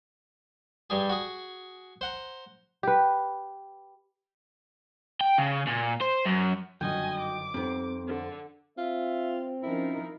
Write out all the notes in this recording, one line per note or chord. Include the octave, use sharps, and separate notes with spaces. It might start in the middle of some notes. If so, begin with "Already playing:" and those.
G2 G3 G#4
F#4 G#4
C5 F#5 A#5
G4 B4
G5
C#3
A#2
C5
F#2
G1 F#2 D3 D#3 F#4 D#5 G5 G#5
D6
F2 G3 B3 C4 D#4 C5
D3
C4 F4 E5
F3 C#4 D#4 E4 A#4